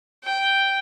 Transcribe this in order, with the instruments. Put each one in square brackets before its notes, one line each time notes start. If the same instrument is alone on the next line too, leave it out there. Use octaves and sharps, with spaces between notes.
[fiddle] G5